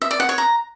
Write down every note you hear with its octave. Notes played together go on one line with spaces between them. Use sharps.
E5
D5
F#5
C#5
A#5